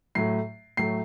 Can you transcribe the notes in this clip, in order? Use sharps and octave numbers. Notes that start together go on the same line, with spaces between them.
A2 F#3 A3 C7
A2 F#3 A3 C7